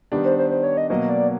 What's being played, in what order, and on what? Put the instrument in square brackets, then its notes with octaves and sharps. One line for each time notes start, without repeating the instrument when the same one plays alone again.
[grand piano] D#3 G3 B3 D4
[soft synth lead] C5
C5
C5
C#5
D#5
[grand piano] B2 F#3 A#3 [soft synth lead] D#5
[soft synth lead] D5